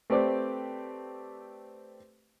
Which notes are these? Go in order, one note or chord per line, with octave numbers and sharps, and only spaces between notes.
A3 C4 G4 B4 C5 D5